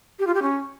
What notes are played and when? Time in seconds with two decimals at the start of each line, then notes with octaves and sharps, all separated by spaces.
0.19 G4
0.27 F4
0.35 G4
0.42 C#4